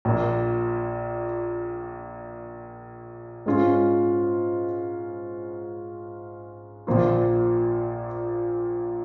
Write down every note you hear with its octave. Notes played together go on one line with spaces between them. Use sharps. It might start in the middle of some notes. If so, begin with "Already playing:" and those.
A#1 A#2 A#3
G#2 G#3 C#4 F4
A#1 A#2 F3 A#3 F4